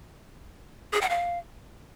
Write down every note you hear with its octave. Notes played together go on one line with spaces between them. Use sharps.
G#4
F#5
F5